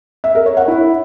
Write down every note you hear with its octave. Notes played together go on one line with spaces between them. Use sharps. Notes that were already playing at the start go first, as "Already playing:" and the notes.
E5
A#4
C#5
F#5
E4